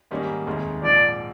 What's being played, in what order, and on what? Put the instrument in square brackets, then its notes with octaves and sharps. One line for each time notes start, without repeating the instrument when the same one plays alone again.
[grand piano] G#2 D#3 G3 A#3 C#4
F1 D#2 D#3 G#3
[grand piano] A#1 G#2 F3 [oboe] D5